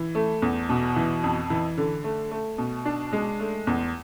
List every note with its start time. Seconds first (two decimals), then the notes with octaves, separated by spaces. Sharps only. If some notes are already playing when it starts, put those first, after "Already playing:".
Already playing: E3
0.15 A3
0.42 E2
0.69 B2
0.96 E3
1.24 F2
1.50 E3
1.77 D3
2.04 A3
2.31 A3
2.58 B2
2.85 D4
3.13 G#3
3.40 A3
3.67 E2